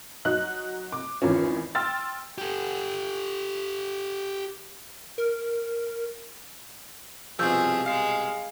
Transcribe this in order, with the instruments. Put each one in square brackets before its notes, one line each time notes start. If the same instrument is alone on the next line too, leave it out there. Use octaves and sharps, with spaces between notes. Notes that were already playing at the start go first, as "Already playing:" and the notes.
[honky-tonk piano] F#3 D#4 F#6
D6
G#1 E2 F3 C#4
G5 C6 E6 F6 A6
[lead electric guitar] G4 A4
[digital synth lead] A#4
[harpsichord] C2 G2 B2 [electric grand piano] F3 C4 [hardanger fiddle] G#4 [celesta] E6 G6
[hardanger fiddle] G#3 [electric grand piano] F5 C7